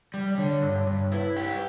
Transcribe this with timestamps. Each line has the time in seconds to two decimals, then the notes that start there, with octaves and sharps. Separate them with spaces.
0.13 G3 D5
0.31 D5
0.38 D3 C#5
0.62 G2
0.87 G2
1.12 E4 B4
1.36 G4